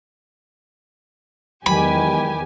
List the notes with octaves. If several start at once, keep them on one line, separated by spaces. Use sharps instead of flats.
E2 D#3 F#3 G#3 G4 G#5 B5